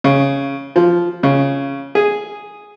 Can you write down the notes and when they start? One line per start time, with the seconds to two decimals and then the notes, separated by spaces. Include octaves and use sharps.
0.04 C#3
0.76 F3
1.23 C#3
1.95 G#4